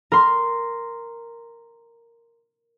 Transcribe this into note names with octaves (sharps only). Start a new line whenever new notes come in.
A#4 C6